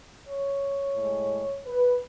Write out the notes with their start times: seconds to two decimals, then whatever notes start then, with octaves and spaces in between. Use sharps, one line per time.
0.26 C#5
0.96 A2 G#3
1.66 B4